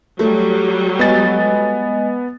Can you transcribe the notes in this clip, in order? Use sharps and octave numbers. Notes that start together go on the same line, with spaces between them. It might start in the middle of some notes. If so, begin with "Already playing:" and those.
F#3 G3 A3 A4
G#3 B3 D#5 G#5 A6